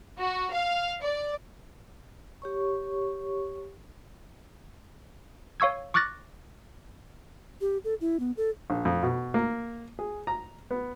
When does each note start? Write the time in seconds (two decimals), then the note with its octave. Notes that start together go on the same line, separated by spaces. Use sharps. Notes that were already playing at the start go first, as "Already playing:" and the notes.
0.18 F#4
0.53 F5
1.03 D5
2.42 G4 C#5 C#6
5.60 C#5 F5 C#6 E6 G#6
5.94 C#6 D6 F6 F#6 A6 A#6
7.61 G4
7.84 A4
8.01 E4
8.20 B3
8.37 A4
8.70 A#1
8.85 F2
9.03 B2
9.34 A#3
9.99 G#4
10.27 A#5
10.71 B3